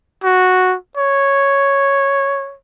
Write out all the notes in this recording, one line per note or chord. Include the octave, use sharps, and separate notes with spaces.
F#4
C#5